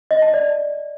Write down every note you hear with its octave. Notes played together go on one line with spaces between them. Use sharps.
D#5
A5
D5